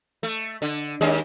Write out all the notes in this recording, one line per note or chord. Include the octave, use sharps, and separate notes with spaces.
A3
D3
D#2 G#3 D4